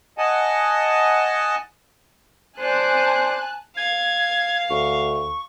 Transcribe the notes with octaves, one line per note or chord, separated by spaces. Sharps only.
D#5 F#5 G#5 A5
C5 D5 G#5 A5 F#6
F5 G#6
D2 C#6